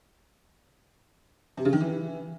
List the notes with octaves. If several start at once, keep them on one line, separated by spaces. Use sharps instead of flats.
C3
C#3
D#3
E3